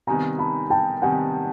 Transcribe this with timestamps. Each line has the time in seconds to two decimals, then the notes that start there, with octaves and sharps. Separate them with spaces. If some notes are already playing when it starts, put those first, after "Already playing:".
0.07 C3 D#3 G3 B3 G#5 A#5
0.39 A5 B5
0.70 G5 A5
1.02 C3 D#3 G3 B3 F#5 G#5